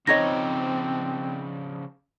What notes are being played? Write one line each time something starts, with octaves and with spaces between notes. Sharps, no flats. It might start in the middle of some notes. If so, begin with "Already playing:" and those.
C#3 F3 C4 D4 D#4 C#5 D#5 A#6